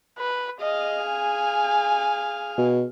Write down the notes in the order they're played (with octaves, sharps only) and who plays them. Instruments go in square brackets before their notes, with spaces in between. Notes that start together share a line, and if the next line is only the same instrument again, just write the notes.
[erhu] B4
[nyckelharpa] G#4 F5 [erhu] D#5
[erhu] G#5
[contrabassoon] B2